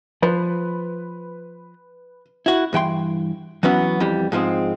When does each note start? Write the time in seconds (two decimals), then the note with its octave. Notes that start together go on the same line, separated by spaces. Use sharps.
0.22 F3 B4
2.46 E4 F#4
2.73 G2 E3 G5 C6
3.63 E3 F#3 B3 C#4 F#4
4.00 F2 E3 G3
4.32 G#2 F3 G#3 C4